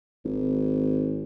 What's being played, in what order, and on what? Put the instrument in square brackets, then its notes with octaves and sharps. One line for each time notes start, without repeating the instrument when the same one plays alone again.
[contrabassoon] G#1